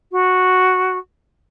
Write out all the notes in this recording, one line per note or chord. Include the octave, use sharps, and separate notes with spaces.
F#4